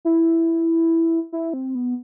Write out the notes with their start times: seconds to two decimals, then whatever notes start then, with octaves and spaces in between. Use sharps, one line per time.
0.05 E4
1.32 E4
1.53 C4
1.75 B3